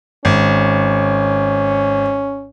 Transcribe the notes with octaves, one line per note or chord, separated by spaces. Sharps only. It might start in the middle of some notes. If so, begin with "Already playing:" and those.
G#1 C#4